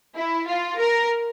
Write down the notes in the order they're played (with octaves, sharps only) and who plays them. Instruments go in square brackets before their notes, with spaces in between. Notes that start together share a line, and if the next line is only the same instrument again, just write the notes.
[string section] E4
F4
A#4